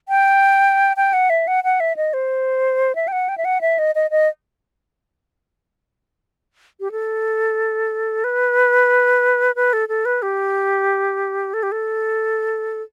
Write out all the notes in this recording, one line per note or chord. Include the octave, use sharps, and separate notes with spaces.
G5
G5
F#5
E5
F#5
F#5
E5
D#5
C5
E5
G5
F#5
G5
E5
F#5
E5
D#5
D#5
D#5
G4
A4
B4
B4
A4
A4
B4
G4
A4
G4
A4